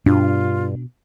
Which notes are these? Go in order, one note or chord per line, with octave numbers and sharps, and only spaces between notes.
G2 B2 D4 F4